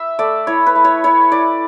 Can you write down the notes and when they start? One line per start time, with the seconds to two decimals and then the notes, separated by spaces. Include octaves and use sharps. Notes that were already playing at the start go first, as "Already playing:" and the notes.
Already playing: E5
0.19 A3 D5
0.47 E4 C#5
0.66 B4
0.75 A3
0.85 C#5
1.04 E4 C#5
1.32 E4 D5